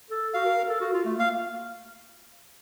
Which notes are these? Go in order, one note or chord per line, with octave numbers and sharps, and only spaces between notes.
A4
F#4 F5
A#4
A#4
A4
F#4
F4
A3
A#3 F5